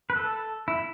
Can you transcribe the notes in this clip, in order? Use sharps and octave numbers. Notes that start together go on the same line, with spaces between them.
B4
A4
E4